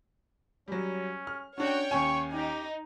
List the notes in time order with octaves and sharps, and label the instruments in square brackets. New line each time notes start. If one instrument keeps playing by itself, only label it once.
[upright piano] F#3 G3 [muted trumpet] C#4
[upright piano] F6
[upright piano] C#4 D4 [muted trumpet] F#4 [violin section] C#5 G5
[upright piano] D#2 C#4 G#5 [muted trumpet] C#6
[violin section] D#4 [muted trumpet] G4